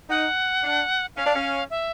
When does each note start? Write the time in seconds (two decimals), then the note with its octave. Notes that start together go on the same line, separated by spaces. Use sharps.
0.09 D#4 F#5
0.64 D4
1.16 C#4 F5
1.26 D4
1.35 C#4
1.70 E5